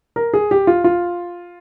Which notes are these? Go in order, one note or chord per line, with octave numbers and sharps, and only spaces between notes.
A#4
G#4
G4
F4
F4